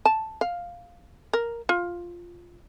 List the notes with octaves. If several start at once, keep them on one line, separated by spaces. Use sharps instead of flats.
A5
F5
A#4
F4